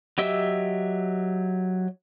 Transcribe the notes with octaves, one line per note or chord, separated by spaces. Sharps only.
F#3 G4 D#5 E5 E6